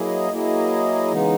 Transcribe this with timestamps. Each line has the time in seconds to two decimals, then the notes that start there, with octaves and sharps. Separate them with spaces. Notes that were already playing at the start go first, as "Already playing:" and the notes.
Already playing: F#3 A#3 E4 G#4 D#5
0.31 F#3 A#3 E4 G#4 D#5
1.12 C#3 E3 G#3 B3 D#4